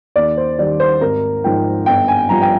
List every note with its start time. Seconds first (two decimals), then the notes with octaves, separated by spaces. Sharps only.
0.16 D#2 D5
0.37 C5
0.59 D#3 G3 D5
0.80 C5
1.01 G#1 A#4
1.44 G#2 F3 G5
1.86 G1 G5
2.08 G#5
2.29 G2 F3 A#5
2.42 G5